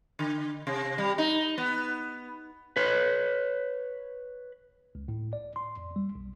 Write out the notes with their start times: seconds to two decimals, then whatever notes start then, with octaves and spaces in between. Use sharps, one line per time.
0.19 D3
0.67 C3
0.98 G3
1.18 D#4
1.58 B3
2.77 B4 C#5
4.95 C#2
5.08 A2
5.33 D5
5.56 C6
5.77 F2
5.96 G3
6.15 B1